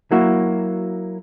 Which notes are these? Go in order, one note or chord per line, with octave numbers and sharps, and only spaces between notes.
F#3 A#3 E4 F#4